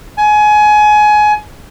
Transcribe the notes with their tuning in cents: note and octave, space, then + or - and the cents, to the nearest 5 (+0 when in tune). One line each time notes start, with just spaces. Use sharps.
G#5 +25